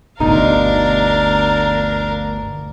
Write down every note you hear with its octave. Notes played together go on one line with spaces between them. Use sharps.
G1 D2 B2 D4 D#4 A#4 C5 F5